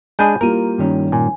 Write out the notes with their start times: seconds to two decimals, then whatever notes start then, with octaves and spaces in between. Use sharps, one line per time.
0.19 G#3 D4 G#4 G#5 B5 G6 D#7
0.41 G3 A#3 E4 F4 A#4 D#7
0.78 G2 D#3 C#4
1.12 A#2 G#5